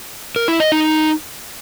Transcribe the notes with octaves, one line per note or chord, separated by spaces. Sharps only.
A#4
E4
D#5
D#4